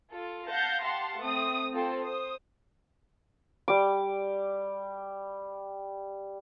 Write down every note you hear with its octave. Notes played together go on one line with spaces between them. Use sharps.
F4 A4
F5 F#5 A5 G6 A6 A#6
G4 F5 F#5 A5 C6
A3 C4 D#6
C4 F4 A4 C5 G5
C5 D#6
G3 D6